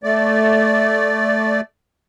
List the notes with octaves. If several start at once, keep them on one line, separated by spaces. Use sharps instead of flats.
A3 D5